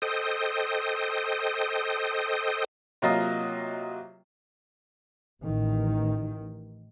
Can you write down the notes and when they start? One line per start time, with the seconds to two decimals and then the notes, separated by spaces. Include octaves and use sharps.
0.02 A4 C5 D#5 G5 D#6
3.02 C3 F#3 A#3 F4 D#5 A#5
5.44 A1 D#3